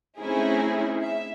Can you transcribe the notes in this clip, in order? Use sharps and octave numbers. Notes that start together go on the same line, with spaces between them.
A3 C4 C#4 D#4 E4 G#4
E5